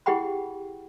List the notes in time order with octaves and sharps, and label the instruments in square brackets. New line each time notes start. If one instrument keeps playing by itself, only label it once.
[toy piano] E4 G4 G#4 F#5 G5 B5